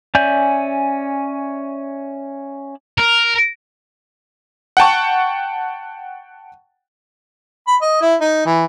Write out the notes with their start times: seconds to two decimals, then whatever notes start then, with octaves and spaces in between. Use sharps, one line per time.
0.15 C#4 D5 E5 G#5 G6
2.98 A#4
4.77 F#5 G5 A5 C#6
7.67 B5
7.81 D#5
8.02 E4
8.21 D#4
8.46 E3